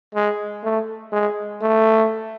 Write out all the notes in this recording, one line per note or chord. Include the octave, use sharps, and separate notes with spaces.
G#3
A3
G#3
A3